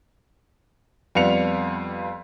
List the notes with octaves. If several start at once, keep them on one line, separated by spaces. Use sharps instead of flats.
F2 G3 B3 F4 C#7 F7